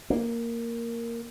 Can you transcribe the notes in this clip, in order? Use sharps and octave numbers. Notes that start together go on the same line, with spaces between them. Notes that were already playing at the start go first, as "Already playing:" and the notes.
A#3